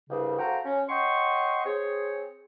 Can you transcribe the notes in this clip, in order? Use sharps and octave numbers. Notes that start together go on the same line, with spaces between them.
C2 G2 C#3
F#4 A4 C5 F5 G5 A#5
C#4
C#5 D#5 F#5 G5 C6 C#6
C4 G#4 C#5